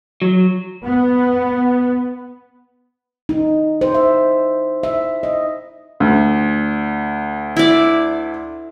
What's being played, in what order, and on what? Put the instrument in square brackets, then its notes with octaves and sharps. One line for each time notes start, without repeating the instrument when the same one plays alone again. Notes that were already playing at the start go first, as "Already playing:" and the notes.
[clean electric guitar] F#3
[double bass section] B3
[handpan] D#4
C5
E5
E5
D#5
[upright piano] D2
[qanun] E4 D5